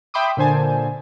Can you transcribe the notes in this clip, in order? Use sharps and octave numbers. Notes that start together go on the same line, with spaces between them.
E5 G5 B5 C6 D6 D#6
A#2 D3 C5 G#5 A5